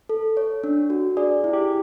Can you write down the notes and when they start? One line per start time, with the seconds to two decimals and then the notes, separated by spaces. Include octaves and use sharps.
0.09 A4
0.37 C#5
0.64 D4
0.90 F#4
1.17 G#4 D5
1.44 E4
1.53 G4